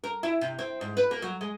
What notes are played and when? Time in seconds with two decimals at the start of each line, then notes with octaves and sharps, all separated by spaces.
0.04 A#4
0.23 E4
0.41 C3
0.59 C4
0.81 G#2
0.97 B4
1.11 A#3
1.22 F#3
1.41 G#3